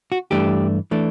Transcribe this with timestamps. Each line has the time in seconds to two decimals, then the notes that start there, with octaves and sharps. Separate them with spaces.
0.12 F#4
0.31 G2 E3 A3 D4 G4
0.91 E3 A3 D4